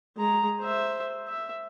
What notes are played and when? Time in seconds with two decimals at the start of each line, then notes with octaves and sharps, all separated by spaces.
0.17 G#3 A#5
0.61 C5 E5
1.28 E5